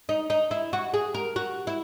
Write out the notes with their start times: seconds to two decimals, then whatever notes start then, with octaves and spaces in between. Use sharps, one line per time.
0.09 D#4
0.30 D#4
0.51 E4
0.73 F#4
0.94 G#4
1.14 A#4
1.36 F#4
1.67 E4